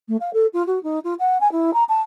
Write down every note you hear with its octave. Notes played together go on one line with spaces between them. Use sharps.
A3
F5
A4
F4
F#4
D#4
F4
F#5
G#5
E4
A#5
A5